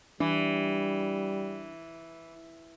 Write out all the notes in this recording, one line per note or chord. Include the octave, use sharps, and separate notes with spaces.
E3 G3 D4